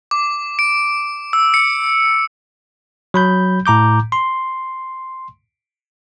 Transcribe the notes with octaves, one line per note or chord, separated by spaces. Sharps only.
D6
D7
E6
C#7
F#3 B5 G6
A2 A#5 D6 G6
C6